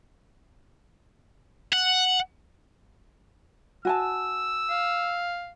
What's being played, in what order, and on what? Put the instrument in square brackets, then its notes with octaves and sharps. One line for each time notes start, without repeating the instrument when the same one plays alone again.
[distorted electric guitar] F#5
[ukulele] F#4 G#5 A5 [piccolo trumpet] E6
[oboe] F5